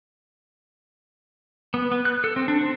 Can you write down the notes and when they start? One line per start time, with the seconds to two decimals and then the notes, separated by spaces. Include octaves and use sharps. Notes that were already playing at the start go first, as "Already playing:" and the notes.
1.74 B3
1.92 B3
2.05 F#6
2.24 A4
2.36 C4
2.48 D4
2.61 C4